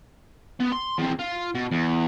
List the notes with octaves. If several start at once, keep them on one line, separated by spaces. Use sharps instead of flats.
B3
C6
E2 C4
F4
B2
E2